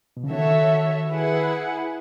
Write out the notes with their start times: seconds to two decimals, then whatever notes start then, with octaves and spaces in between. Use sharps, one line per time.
0.17 B2
0.24 C#3
0.31 D#3 F#4 A4 C#5 E5
1.11 E4 G#4 B4 F#5